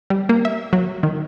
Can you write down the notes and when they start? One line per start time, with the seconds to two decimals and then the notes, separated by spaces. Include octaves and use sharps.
0.10 G3
0.29 A#3
0.45 E5
0.73 F#3
1.03 D#3